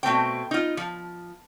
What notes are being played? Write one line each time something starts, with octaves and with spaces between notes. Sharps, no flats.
B2 A3 C4 G5
D#4 F4
F3